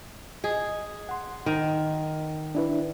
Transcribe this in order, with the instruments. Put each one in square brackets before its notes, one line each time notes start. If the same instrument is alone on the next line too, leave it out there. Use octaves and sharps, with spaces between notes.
[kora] G#4 [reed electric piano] D#5
[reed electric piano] F#5 C6
[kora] D#3
[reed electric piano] D4 E4 B4